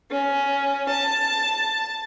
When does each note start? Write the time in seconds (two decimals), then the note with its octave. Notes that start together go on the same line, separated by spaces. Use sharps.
0.10 C#4
0.89 A5